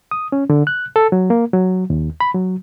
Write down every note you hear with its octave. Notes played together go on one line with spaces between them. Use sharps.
D#6
C#4
D3
F#6
A4
F#3
A#3
F#3
D#2
B5
F#3